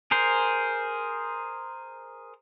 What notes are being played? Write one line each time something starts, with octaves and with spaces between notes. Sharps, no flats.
G#4 A#4 C5